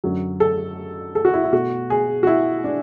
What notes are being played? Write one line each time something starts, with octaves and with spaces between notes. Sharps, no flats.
F#2 D3 F#3
A4
A4
F#4
E4
E4
B2 A3 F#4
G#4
F#4
E4
D4